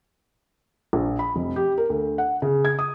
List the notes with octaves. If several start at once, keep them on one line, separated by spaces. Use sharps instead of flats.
A#1
B5
F1
G4
A#4
D2
F#5
C#3
G#6
D#6